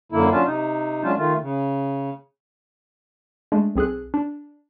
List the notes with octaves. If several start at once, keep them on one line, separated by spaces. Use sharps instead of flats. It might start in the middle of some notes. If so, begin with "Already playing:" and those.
F#2 D3 A#3 E4
F#3 C#4 D4 F4
C3 D#4
F#3 G#3 C#4 D4 F4
D#3 A3 F4
C#3
G#3 A3 D4
B1 C4 G#4 A4 F#6
D4